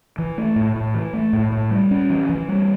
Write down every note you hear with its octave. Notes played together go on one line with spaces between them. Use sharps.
E3
A3
A2
A2
E3
A3
A2
A2
G3
C#4
E3
E3
G3